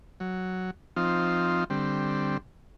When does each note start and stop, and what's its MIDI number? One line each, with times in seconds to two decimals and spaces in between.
0.20 0.71 54
0.96 1.64 53
0.96 1.64 60
0.96 1.64 63
0.96 1.64 65
1.70 2.37 50
1.70 2.37 55
1.70 2.37 60